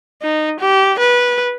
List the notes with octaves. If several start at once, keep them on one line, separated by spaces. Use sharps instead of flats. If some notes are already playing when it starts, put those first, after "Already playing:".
D#4
G4
B4